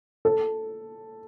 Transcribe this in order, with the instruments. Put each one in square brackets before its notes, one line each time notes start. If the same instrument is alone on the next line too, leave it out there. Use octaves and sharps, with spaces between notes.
[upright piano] A4